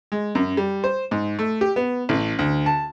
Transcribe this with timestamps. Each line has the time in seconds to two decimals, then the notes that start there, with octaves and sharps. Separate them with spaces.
0.12 G#3
0.35 F#2
0.57 G3
0.84 C5
1.11 G#2
1.39 A3
1.61 G4
1.76 B3
2.09 A1
2.39 D2
2.66 A5